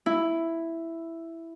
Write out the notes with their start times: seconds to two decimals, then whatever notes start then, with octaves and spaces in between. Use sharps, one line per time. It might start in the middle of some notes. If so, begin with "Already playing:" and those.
0.06 E4